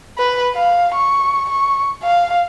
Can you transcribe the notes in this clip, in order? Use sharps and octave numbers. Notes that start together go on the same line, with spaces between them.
B4
F5
C#6
C#6
F5